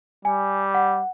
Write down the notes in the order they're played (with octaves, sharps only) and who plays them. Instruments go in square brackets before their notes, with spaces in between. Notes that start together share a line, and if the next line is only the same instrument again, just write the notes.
[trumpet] G3 [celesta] G#5
[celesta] F#5